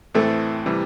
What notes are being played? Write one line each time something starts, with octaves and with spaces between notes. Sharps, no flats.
A2 E3 A3 C4
C3 E3 G3